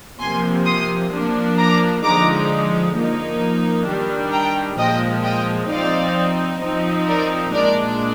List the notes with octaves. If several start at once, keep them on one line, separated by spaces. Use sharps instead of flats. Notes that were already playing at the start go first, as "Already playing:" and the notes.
C3 F3 A#3 G#5 C6
C6 D#6
F3 A#3 D4
A#5 D6
D3 F3 G#3 D#4 A#5 D6
F3 A#3 D#4
D#3 G3 D4
G5 A#5
A#2 F3 G#3 D#5 G5
D#5 G5
F3 C4 D#4 D5 F5
F3 C4 D#4
A#4 D5
A#2 G#3 D4 A#4 D5